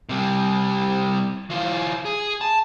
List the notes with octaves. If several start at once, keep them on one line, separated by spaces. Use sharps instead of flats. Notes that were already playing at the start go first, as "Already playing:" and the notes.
C3 G3
E3 F4
G#4
A5